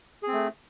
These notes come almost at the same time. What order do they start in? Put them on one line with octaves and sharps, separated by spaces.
G#4 C4 A3